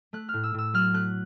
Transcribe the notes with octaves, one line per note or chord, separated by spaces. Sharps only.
A3 F#6
A2 F6
E6
A2 E6
F#3 F6
A3 F#6